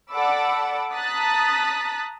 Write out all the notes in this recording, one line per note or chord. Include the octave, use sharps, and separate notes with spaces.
A4 D5 F#5 B5 D6 E6
A5 A#5 D#6 F#6 A6 B6